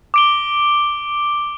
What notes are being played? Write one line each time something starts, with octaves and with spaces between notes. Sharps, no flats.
D6 D7 G7